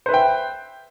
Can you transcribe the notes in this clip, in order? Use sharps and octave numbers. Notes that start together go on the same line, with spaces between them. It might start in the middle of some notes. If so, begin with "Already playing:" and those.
B4 C5 E5 G5